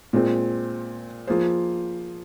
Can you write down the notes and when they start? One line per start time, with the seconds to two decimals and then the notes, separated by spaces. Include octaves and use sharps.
0.13 A#2 G#3 C4
1.27 F3 A#3 F4 G#4 C5